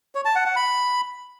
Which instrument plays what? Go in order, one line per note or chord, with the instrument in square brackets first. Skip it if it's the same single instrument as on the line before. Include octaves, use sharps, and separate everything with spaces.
[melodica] C#5
A5
F#5
F#5
B5